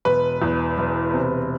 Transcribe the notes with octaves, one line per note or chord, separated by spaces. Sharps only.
E1 B4
E2
E1
C3